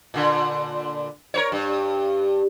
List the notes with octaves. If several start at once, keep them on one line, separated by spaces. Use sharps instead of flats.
A#2 D3
A#4 C5 C#5
G2